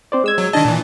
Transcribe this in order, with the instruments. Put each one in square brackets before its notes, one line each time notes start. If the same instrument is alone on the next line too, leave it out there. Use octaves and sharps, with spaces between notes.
[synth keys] C4 C5 D5
G#3 E6 G#6
[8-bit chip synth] F#3
[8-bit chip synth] D#3 D#5 [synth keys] D4 A5
[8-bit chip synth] A#2 E3